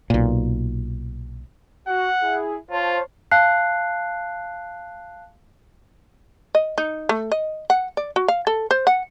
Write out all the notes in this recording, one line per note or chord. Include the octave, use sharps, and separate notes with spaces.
B1 A#2
F#4 F#5
E4 G#4
F4 C5 C#5 A5
F5 A5 F#6 C7
D#5
D#4
A3
D#5
F#5
D5
F#4
F5
A4
C5
F#5